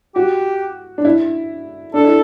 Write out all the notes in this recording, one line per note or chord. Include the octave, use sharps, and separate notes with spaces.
F#4 G4
D4
E4
D4 A4
E4